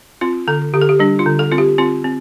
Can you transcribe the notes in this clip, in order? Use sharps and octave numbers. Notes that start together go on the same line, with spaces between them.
C4 F4
D3 A4
D3 G4
A4
G4
G3 D4
F4
D3
A4
C4 F4
G4
C4 F4
C4